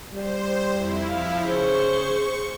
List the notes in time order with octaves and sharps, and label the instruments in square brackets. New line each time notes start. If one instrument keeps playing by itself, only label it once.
[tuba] G3 [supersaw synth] C5
[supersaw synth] F2 E4
[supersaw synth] F3 E4 [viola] F5
[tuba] C#3 [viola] G#4 C5 [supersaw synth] C#6